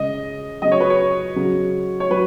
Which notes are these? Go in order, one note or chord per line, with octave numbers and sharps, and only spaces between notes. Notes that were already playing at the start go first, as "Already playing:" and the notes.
Already playing: C#3 G#3 D#5
C#3 F#3 D#5
C#5
B4
C#5
C#3 F#3
C#5
F#3 B4